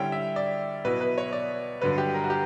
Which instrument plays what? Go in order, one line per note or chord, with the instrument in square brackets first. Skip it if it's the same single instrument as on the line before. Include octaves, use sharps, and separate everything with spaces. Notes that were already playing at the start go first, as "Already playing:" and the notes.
Already playing: [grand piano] D3 G3 C#4 E4 G5
E5
D5
B2 F#3 B3 E4 B4
B4
C#5
D5
G2 D3 F#3 B4
G4
A#4
F#4
G4